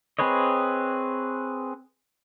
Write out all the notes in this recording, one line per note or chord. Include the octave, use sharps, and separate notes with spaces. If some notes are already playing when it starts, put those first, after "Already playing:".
C4 G#4 B4 C#5 D#5